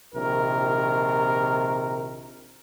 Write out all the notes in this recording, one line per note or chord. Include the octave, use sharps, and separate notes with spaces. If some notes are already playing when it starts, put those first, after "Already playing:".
A#1 C3 D#3 A#4